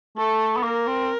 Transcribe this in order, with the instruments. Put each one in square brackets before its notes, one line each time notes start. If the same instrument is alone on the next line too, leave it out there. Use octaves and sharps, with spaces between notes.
[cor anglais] A3 [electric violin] A4
[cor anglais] B3
[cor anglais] A#3 [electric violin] A#4
[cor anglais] C4